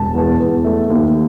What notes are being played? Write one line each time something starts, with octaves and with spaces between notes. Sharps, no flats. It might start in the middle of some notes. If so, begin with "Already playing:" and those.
Already playing: E1 A5
E2
E2
A3
D#2